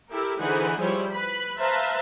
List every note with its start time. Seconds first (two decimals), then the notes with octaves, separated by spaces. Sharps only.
0.10 E4 G4 A4 A#4
0.39 D3 E3 D#4 G#4 C5 F#5
0.79 F3 G3 E4 C5 C#5
1.11 B4 B5
1.59 B4 C5 E5 F5 A5 A#5